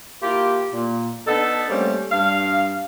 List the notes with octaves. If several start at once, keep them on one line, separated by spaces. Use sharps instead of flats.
A#3 E4 F4 G4
A#2
B3 D4 D#4 A4
G3 A3 A#3 C4 C#4
G2 F5